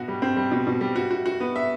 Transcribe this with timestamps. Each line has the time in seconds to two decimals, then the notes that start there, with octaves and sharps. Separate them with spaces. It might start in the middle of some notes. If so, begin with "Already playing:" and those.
Already playing: B2 F#4
0.08 G3
0.22 C4
0.37 G3
0.51 B2
0.67 B2
0.81 G3
0.96 F#4
1.11 F#4
1.26 F#4
1.40 B3
1.56 E5